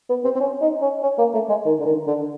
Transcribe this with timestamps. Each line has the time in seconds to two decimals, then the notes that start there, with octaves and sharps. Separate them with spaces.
0.09 B3
0.24 C4
0.36 C4
0.40 C#4
0.61 D#4
0.81 C#4
1.03 C#4
1.18 A#3
1.34 A3
1.49 G#3
1.65 D#3
1.79 D3
1.85 D#3
2.07 D3